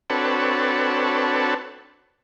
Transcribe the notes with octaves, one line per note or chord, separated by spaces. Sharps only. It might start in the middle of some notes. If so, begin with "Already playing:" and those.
C4 D4 F#4 A4 B4 C#5